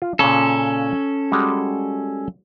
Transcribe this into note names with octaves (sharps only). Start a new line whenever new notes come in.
F4
A#2 C#3 C#4 A4
G3 G#3 F#4